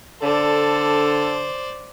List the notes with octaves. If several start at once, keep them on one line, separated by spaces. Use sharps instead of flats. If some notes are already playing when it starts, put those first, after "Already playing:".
D3 A4 C5 D5